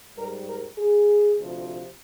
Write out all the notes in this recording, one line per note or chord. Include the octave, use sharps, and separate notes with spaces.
G#2 G3 A#4
A#4
G#4
D2 C3 F3